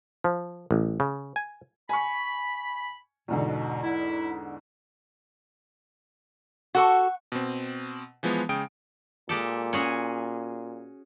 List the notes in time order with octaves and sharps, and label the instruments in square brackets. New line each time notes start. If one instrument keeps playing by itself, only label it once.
[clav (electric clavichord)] F3
A1
C#3
G#5
[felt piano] G#5 C#6 [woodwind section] B5
[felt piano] E2 G#2 D3 [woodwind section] B2
[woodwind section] E4
[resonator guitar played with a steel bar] F#4 A4 [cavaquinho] F#5 C#6
[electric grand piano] B2 C4
E3 F3 G#3 B3
C#3 G#3 G5 D#6 D7
[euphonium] A#2 [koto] G#3 G4 A4
[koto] C#4 F#4 G#4